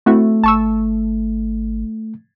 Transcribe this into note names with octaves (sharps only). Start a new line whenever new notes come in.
A3 C4 E4 F#4
G#1 A5 C#6 E6